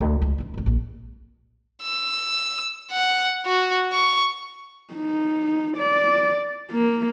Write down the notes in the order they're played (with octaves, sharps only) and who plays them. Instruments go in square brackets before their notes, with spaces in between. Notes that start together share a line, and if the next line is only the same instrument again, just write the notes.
[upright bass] D2
C#2
E3 D4
G#1 D#3
A#1 G2
[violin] E6
F#5
F#4
C#6
[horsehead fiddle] D#4
D5
A#3